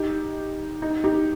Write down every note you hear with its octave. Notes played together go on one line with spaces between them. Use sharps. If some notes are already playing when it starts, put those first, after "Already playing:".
Already playing: D#4 G4
D#4
D#4 G4